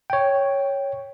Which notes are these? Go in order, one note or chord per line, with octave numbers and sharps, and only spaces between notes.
C#5 G5